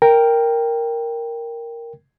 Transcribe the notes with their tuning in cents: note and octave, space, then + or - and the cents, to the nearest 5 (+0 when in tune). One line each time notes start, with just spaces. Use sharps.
A#4 +0 G5 +5